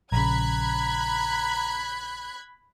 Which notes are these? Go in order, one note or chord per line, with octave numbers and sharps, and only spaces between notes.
A#1 C#3 A#5 B5 F#6 G#6